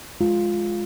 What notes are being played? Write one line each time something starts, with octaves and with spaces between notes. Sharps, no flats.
G#3 F4